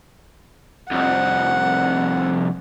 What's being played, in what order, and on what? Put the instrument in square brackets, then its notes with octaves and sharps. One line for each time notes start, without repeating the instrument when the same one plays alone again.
[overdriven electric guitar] C2 F2 [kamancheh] F#5